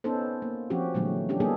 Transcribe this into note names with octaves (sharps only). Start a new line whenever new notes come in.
B3 C#4 D#4 A4 C5
A#3
F3 C4 C#4 F#4 G4
A#2 D3 E3 F#3 G#3 A3
C#4 D4 G4
G3 A#3 B3 D#4 G#4 A4